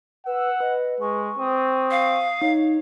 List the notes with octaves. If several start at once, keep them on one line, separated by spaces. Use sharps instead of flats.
B4 F#5 E6
B4 D#5
G#3 C#6
C4 D#6
F5
D#4 C#5